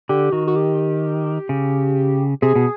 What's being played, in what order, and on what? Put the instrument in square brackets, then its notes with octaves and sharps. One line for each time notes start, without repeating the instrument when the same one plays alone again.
[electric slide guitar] D3 [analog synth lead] G4
[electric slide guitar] D#3 [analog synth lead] F#4
[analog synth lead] F#4
G4
[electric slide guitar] C#3
[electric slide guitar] C3 [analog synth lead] G#4
[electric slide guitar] B2